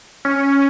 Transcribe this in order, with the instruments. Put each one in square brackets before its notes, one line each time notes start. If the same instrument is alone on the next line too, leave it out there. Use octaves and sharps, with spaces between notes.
[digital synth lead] C#4